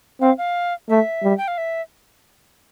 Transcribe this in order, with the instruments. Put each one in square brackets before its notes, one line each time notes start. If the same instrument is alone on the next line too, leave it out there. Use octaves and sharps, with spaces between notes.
[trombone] C4 [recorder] F5
[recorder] F5
[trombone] A3 [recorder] E5
[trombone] G3
[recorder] G5
F5
E5